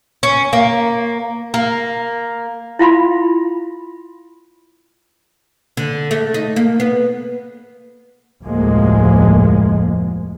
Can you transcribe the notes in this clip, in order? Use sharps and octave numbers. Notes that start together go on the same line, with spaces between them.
C#4
A#3
A#3
E4 F4 F5 B5 C6
D3
A3
D#4
A#3
B3
F1 D2 A2 F3 G#3 A#3